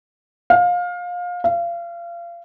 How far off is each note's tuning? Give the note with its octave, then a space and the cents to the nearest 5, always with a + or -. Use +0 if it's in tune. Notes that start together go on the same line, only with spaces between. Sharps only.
F5 +25
F5 -30